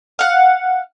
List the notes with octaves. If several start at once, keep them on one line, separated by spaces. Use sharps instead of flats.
F5 F#5